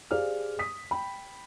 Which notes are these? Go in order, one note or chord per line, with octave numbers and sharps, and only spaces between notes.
G4 G#4 C5 D5 F5 F6
D#6 B6
G5 B5